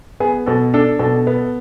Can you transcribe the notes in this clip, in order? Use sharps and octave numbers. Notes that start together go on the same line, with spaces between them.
B3 G#4
B2 A4
D4 A4
B2 A4
B3